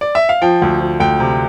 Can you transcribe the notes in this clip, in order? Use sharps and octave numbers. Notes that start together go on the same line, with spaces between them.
D5
E5
F5
F3 G5
D2
F3
D2 G5
C3